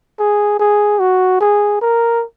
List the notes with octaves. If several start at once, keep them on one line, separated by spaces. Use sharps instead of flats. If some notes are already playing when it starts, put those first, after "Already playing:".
G#4
G#4
F#4
G#4
A#4